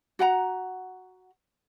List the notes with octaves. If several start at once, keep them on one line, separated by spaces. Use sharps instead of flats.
F#4 F#5 G5 A#5